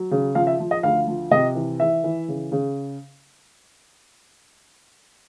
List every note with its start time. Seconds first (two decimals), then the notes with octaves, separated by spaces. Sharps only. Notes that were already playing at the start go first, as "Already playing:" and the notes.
Already playing: F#3
0.11 C#3
0.35 F3 F5
0.47 E5
0.60 F3
0.71 D#5
0.83 D2 F5
1.08 F3
1.31 C3 D#5
1.56 E3
1.80 E3 E5
2.04 E3
2.28 C#3
2.52 C#3